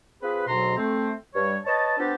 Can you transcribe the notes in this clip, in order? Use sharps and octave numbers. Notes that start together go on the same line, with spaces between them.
C4 F4 G#4 B4
D2 G#2 B2 F#3 A#5 C6
A3 C4
G2 G3 C#5
B4 C#5 D#5 A5
B3 C4 D4 F4 G4 A4